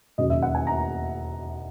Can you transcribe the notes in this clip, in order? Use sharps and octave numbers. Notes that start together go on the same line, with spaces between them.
E1 D#2 C#3 F#3 D#5
E5
F#5
G#5
A#5